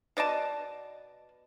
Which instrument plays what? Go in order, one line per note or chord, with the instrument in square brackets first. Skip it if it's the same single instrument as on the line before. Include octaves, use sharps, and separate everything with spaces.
[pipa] B2 D5 D#5 A5